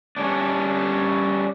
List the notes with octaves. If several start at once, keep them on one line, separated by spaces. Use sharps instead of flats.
G3 C#4 D4